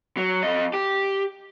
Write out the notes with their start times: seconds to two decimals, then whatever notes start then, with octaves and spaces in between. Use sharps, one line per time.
0.17 F#3
0.43 F2 D#5
0.74 G4